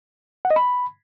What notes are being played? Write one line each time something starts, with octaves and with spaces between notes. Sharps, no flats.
F#5
D#5
B5